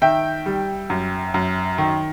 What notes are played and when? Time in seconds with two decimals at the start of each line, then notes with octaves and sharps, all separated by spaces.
0.01 D#3 E5 G5
0.46 G3
0.90 F#2
1.34 F#2
1.78 D#3